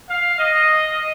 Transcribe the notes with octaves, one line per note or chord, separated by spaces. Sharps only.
F5
D#5